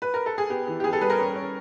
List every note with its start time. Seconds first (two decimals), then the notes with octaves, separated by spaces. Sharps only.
0.02 B4
0.14 A#4
0.26 A4
0.38 G#4
0.50 B3 G4
0.68 E3
0.80 G4
0.84 B3 G#4
0.93 A4
1.01 G3 B4
1.10 A#4
1.19 C#4
1.35 C#4